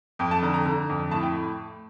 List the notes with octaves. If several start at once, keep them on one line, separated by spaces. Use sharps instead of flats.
F2 G5
A5
D3 A#5
A#5
D3
F2
A2 A5
G5